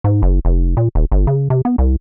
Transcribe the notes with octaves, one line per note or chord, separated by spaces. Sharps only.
G#2
F#1
F1
A#2
D#1
G1
C#3
C3
B3
C2